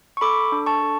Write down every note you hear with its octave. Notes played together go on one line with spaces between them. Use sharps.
C#6
A4 B5 D6
D4
A5 C#6
A4